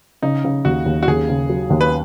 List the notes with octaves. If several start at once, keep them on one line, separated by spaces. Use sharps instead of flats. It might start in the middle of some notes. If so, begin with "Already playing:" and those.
C#3 D#4
C#3
D#2 F#4
D#2
F#4
D#2 G#4
C#3
F#3
D#2
B4